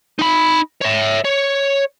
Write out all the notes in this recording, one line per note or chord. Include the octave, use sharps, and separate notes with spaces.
D#4 B5
C#5 E5
C#5